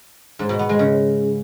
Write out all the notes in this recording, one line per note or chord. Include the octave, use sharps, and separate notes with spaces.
G#2
B2
B3
G#3
C#3